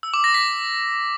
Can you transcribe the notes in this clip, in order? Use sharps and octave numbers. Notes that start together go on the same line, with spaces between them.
E6
D6
A#6
B6